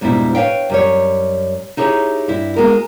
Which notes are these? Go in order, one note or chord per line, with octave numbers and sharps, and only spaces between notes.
F2 G#2 B2 G3 D4 E4
B4 C#5 E5 F5 G5
F#2 G3 C#5
D#4 E4 G4 G#4 C#5
G2 E4
G#3 B3 F#4 A#4